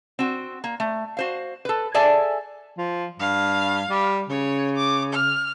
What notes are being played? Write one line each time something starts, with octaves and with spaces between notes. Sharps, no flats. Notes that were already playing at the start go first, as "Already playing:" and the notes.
C4 F#4
A#3
A3
F#4 C5 F5
A4 B4
G#4 A4 D5 E5 G#5 A5
F3
G2 F5
G3
C#3 C#5
D6
F6